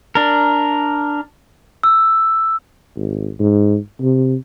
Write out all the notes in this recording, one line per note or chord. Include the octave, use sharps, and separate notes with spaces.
D4 A#4
E6
G#1
G#2
C3